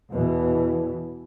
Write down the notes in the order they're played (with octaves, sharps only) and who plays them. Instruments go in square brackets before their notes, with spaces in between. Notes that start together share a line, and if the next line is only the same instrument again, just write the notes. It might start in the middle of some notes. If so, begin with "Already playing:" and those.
[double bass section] E2 B2 E3